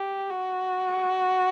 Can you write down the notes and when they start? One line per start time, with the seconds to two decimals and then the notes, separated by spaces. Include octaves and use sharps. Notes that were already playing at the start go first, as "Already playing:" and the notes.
Already playing: G4
0.31 F#4